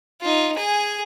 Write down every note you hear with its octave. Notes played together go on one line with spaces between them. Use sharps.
D#4 F4
G#4 G#5